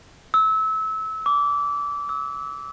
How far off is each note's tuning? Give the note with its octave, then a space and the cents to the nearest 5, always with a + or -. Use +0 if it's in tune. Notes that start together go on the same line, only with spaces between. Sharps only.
E6 -25
D6 -25
E6 -30